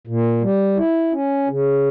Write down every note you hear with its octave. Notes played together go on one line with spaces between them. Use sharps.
A#2
G3
E4
C#4
C#3